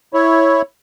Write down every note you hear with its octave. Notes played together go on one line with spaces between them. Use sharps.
E4 C#5